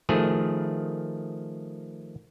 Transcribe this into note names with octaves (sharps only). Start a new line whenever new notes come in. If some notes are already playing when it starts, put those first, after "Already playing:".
D#3 F3 A3 G#4